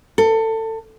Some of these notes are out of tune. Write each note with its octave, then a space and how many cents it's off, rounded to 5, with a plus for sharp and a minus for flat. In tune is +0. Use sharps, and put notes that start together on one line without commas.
A4 +25